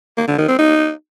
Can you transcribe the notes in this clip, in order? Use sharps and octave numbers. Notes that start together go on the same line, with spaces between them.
A#3
D3
D#3
C4
D#4